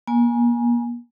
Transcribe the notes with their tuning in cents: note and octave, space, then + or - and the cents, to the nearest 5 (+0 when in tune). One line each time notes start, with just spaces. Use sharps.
A#3 +40 G#5 +0